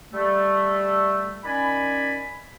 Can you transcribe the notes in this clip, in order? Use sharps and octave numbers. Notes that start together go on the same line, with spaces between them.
G3 A3
D#3 C#4 D5 G#5 B5